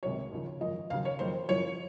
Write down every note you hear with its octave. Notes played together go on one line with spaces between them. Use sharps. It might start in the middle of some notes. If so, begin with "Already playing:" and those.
C#2 C3 D#3 F#3 C#5
D#2 C#3 F3
G#1 F#2 F3 D#5
D#2 C#3 F#3 F5
C#5
F2 D#3 F#3 C5
F#1 F#2 F3 C#5